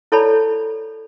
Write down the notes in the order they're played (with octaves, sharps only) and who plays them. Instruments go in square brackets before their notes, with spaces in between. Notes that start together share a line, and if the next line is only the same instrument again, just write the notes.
[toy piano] E4 A4 C#5 D5 A5 B5